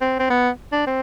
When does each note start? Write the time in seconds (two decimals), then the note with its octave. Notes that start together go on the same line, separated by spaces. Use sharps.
0.01 C4
0.19 C4
0.30 B3
0.72 D4
0.87 C4